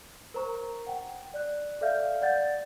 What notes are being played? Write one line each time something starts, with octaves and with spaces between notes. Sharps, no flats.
A#4 C5 A#5 C#6
F#5 G5
D5 F#6
A4 D5 E5 F5 F6 G6
D5 F#5 G6 A6